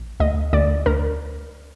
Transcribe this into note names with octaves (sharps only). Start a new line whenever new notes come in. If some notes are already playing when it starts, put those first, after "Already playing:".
Already playing: A#1
D2 D#5
D2 D5
D2 A#4